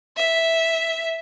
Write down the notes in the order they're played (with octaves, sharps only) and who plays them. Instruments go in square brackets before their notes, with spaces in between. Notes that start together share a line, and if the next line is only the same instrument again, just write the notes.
[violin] E5